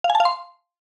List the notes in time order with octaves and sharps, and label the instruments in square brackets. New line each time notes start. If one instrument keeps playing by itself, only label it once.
[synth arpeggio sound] F5
G#5
A5
F5
C6